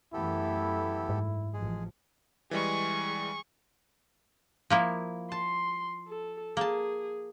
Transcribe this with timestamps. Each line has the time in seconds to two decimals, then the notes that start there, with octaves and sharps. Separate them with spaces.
0.14 F#2 E3 A3 B3 E4 G4 A4
1.09 G#2
1.54 A1 F3 G#3 G#4
2.51 E3 G3 G#3 G#4 C#6
4.70 F3 A#3 E4
5.32 A5 C6
6.07 A4
6.57 A#3 G#4 A5